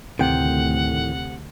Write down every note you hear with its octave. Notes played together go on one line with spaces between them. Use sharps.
D2 A2 C3 D#3 F#5 G5